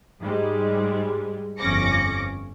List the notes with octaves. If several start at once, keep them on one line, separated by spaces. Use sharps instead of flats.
G#2 G3 G#3
G1 F2 C#4 D6 A#6 C#7